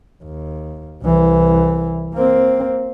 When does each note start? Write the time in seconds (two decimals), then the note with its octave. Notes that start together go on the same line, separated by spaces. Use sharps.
0.24 D#2
1.03 C2 E3
2.14 A#3 C4